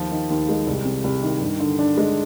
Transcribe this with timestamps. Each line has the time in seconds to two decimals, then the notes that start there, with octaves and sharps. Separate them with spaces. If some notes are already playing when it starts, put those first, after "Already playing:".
Already playing: D#2 F3
0.12 D#3
0.30 D#2
0.49 G#3
0.67 C2
0.85 C3
1.04 C2
1.23 D#3
1.41 G2
1.60 D3
1.79 D4
1.98 G#3